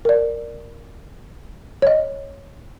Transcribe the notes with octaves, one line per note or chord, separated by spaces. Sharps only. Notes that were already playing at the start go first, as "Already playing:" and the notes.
A#4 D5
C#5 D#5